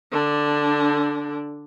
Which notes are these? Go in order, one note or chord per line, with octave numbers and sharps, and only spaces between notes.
D3 D4